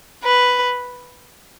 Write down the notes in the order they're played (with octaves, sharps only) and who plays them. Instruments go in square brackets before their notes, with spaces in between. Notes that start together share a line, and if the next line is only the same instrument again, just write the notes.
[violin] B4